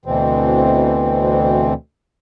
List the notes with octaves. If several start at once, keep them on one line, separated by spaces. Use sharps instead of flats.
D2 B2 E3 C4